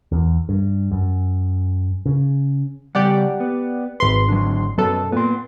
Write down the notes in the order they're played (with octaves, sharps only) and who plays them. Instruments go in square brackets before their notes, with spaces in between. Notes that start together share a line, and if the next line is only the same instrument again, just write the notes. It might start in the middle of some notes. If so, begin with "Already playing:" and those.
[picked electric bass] E2
G2
F#2
C#3
[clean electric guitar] C#3 G3 [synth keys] G4 D5 F#5
[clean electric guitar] B3
[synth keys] G#1 C6 [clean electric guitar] B4
[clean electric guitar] D3 F#3
[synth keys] F#2 A4 [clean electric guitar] B2 B3
[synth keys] A#2 [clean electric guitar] B3 C6